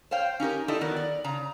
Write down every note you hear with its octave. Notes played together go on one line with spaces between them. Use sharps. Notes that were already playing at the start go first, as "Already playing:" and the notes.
C5 C#5 F5 G5
C#4 D#4 G4 A#4
D#4 E4 G4 A4 D5 D#5
D#3 F#3 B3 A#4 D5
D5
C#3 A#5